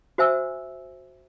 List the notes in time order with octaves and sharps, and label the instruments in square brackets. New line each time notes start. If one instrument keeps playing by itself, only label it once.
[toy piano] F#4 C5 E5 G#5 E6